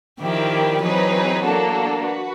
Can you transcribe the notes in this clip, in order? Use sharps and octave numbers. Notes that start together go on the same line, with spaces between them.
D#3 F3 E4 G4 A#4 D5
E3 F#3 C4 D#4 G#4 B4
A#3 D4 F#4 A4
F#4 B4